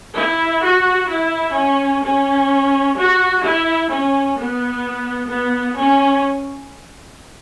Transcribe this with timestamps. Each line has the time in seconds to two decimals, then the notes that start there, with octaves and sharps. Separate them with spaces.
0.17 E4
0.64 F#4
1.11 E4
1.58 C#4
2.04 C#4
2.98 F#4
3.45 E4
3.92 C#4
4.38 B3
5.31 B3
5.79 C#4